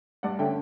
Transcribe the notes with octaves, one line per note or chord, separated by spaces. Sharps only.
G2 D5 F#5
D3 A3 C#4 E5 G5